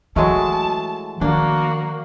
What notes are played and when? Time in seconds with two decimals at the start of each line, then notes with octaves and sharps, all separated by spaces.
0.16 E3 F#3 G#3 A3 A5
1.21 D#3 F3 A#3 D4 F#4